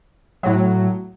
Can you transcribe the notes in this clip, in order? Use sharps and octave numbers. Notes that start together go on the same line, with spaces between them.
A2 F#3